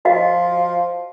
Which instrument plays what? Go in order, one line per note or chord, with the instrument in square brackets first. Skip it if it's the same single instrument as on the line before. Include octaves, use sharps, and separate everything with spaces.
[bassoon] F3 [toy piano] F#4 D#5 F5